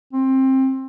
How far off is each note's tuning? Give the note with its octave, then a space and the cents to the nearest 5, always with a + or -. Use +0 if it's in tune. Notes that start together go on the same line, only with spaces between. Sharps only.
C4 +20